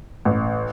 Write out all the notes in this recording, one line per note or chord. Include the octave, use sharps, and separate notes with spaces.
A1